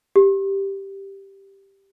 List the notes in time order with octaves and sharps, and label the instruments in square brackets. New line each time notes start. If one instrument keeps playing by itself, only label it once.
[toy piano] G4